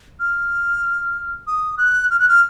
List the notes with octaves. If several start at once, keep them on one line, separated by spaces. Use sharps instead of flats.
F6
D#6
F#6
F6
F#6
F6